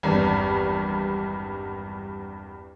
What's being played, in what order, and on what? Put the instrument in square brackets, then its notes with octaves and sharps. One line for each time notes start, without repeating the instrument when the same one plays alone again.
[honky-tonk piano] G#1 E2 G2